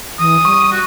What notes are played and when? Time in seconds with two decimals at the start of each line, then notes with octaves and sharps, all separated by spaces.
0.19 E3 D#6
0.45 G3 C#6
0.72 F#4